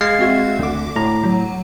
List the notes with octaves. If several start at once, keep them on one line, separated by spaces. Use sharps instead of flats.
G#3 F5 G#6 A6 C7
C4 F#4 E5
D2 D3 D6
A2 A#5
F#3